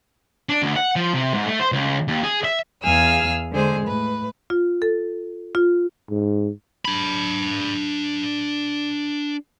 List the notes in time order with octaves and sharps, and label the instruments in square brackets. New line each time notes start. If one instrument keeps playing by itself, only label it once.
[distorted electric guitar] D4
D2
F#5
F3
C3
G#2
A3
C5
C#2
D#2
G#4
E5
[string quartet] E2 G#4 F5 G#5 E6 F6
D3 G#3 G#4 C5
A2 B4
[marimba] F4
A4
F4
[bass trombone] G#2
[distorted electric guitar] D4 B5